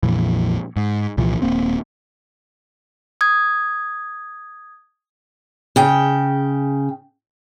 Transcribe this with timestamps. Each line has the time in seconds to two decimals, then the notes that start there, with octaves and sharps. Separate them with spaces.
0.03 A#1 F2 A#2 E3
0.76 G#2
1.17 C2 A#2 E3 F3
1.42 D#1 F2 A#3 C4
3.21 D#6 G#6
5.76 C#3 G5